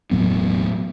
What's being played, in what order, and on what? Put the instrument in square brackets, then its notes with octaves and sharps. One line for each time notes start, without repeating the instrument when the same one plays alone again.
[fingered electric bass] E1 A2 F#3 B3